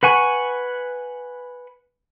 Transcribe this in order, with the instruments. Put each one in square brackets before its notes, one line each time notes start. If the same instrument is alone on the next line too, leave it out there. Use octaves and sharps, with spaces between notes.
[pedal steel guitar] B4 F#5 G#5 C#6